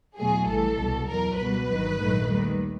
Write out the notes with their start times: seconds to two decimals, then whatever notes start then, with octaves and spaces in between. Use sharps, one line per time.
0.17 E2 B2 F#3 A3 G#4
0.48 A1 A2 E3 G3 A4
0.79 C2 B2 G3
1.08 E2 B2 F#3 A#4
1.38 C#2 B2 G3 B4
1.69 G1 G2 D#3 F#3
2.00 A#1 G#2 D#3 F#3 A3
2.29 D#2 D#3 G3